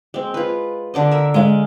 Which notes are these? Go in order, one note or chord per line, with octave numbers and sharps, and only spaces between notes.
G#3 C4
F4 B4
D3 D5 D#5
A#4 E5
G#3 F5